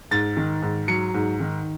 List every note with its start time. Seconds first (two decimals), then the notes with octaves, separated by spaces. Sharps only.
0.11 G#2 A6
0.37 D#3
0.62 G#2
0.88 F#3 C#7
1.14 G#2
1.40 D#3